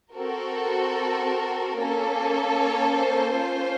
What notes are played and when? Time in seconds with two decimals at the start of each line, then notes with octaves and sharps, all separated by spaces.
0.15 C4 F#4 A4 A#4
1.76 A#3 C#4 A4
2.57 C#5
2.96 C5
3.36 C#4 F4 A4